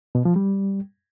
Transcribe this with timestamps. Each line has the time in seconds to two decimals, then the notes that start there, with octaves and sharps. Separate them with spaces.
0.15 B2
0.25 F3
0.36 G3